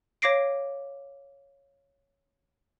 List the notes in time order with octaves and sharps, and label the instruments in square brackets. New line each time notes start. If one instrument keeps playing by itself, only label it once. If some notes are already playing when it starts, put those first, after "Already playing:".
[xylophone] C#5 F5 D6 A#6 C7 D7